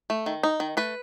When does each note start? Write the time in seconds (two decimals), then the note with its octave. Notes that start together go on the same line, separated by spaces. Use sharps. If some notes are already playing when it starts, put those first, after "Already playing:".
0.10 A3
0.26 D#3
0.43 D#4
0.60 D#3
0.77 A3 B4